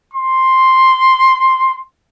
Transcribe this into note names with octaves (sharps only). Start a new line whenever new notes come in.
C6